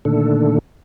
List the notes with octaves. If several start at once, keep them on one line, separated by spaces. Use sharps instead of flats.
A#2 D3 D#3 A3 D4 A4